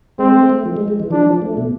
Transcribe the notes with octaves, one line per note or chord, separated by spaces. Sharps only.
G#3 C4
A3
A3
F3
G#3
G#3
E3
F3 D4
F3
A3
B2